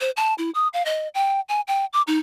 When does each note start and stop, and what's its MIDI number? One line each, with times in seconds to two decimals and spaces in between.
0.01 0.11 72
0.17 0.34 81
0.38 0.50 64
0.55 0.68 87
0.74 0.83 77
0.86 1.08 75
1.15 1.41 79
1.49 1.61 80
1.68 1.85 79
1.93 2.02 86
2.07 2.19 63